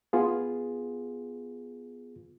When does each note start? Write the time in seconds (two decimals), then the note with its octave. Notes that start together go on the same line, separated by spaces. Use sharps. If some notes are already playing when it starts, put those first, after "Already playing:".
0.13 B3 F4 G#4